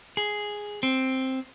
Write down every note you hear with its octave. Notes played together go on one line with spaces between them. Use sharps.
G#4
C4